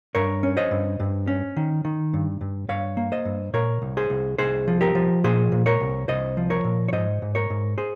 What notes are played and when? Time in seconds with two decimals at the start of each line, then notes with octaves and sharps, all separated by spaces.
0.15 G2 A#4 C#5
0.43 C#4
0.57 C5 D#5
0.71 G2
1.00 G2
1.27 C#4
1.57 D#3
1.85 D#3
2.13 G2
2.41 G2
2.69 G2 C#5 F5
2.97 A#3
3.12 C5 D#5
3.25 G2
3.53 A#2 A#4 C#5
3.82 C2
3.97 G#4 C5
4.10 C2
4.38 C2 G#4 C5
4.68 F3
4.81 G4 A#4
4.95 F3
5.24 A#2 G#4 C5
5.52 A#2
5.66 A#4 C#5
5.81 C2
6.08 C2 C5 D#5
6.37 F3
6.50 A#4 C#5
6.64 A#2
6.88 C#5
6.93 G#2 C5 D#5
7.22 G#2
7.35 A#4 C#5
7.50 G#2
7.78 G#4 C5